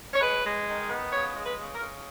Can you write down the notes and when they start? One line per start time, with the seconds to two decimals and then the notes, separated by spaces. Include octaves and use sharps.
0.13 C#5
0.20 G#3 B4
0.43 G#3
0.67 D#3
0.90 B3
1.12 C#3 C#5
1.35 G#3
1.43 B4
1.58 C#3
1.74 A#4
1.81 C#3